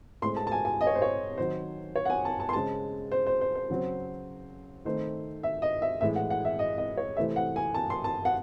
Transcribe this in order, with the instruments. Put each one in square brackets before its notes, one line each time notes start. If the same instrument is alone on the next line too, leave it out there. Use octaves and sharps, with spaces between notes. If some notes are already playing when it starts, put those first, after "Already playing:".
[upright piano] A2 G#3 C4 C6
A5
A5
G#5
G#5
D#5
C#5
C5
C#5
D#3 F#3 C4 C5
C#5
F#5
G#5
A5
A5
C6
C#3 G#3 C4 A5
C5
C5
C5
C5
C#3 F#3 C4
D#3 A3 C4 C5
E5
D#5
E5
A2 E3 G#3 E5
F#5
F#5
E5
D#5
D#5
C#5
C3 E3 A3 C4 E5
F#5
G#5
A5
C6
A5
F#5